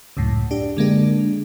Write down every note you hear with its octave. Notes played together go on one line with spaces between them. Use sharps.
C#2 F#2 A2
D4 G4
D3 G#3 A#3 D4